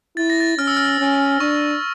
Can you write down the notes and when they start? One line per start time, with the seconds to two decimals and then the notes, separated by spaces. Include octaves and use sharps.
0.17 E4 A6
0.30 A#6
0.40 A6
0.58 C#4 F6
0.67 E6
0.77 F6
1.00 C#4
1.40 D4 C#6